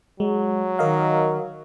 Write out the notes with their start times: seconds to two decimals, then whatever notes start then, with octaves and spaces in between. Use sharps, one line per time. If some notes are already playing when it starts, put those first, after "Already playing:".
0.20 F#3 G#3
0.79 D#3 A#4 D#5 F5